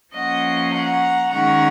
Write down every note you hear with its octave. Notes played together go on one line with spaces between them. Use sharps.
F3 A#3 C#4 D#5 F#5
F#5 A#5
D#3 G#3 C#4 F#5 A#5